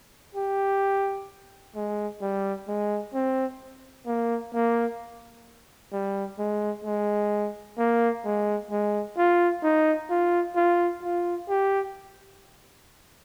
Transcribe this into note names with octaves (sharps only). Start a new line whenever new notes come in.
G4
G#3
G3
G#3
C4
A#3
A#3
G3
G#3
G#3
A#3
G#3
G#3
F4
D#4
F4
F4
F4
G4